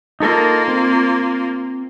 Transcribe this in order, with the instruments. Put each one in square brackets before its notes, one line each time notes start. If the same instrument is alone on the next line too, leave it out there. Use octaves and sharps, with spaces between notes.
[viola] A#3 F4 [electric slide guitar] D#4 A4 A#4
[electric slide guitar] C4